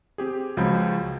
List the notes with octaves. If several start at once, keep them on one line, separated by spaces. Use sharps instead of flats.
C4 G4 G#4
C#2 F3 F#3 G#4 B5 G6